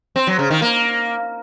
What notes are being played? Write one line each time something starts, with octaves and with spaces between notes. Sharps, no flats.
C4
F#3
C#3
D#3
A#3